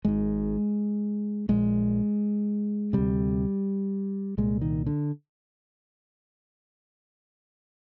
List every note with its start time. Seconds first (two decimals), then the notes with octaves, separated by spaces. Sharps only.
0.05 G#1 G#2 G#3
1.49 A#1 A#2 G#3
2.93 D2 C3 G3
4.38 C2 A#2 G#3
4.61 D#3
4.87 D3